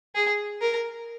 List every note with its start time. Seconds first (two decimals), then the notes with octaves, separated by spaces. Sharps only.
0.15 G#4
0.61 A#4